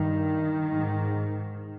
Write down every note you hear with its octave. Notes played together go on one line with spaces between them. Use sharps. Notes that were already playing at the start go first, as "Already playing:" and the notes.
Already playing: G2 D#3
G#2